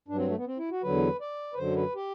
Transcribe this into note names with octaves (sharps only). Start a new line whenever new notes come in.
G2 F#3 D4
C4
A3
B3
C4
E4
F#4
E2 D3 F#3 B4
D5
B4
F#2 D3 F#3 C5
B4
G4